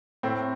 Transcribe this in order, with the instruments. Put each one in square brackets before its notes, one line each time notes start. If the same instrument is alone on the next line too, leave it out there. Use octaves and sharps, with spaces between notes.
[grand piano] A2 C4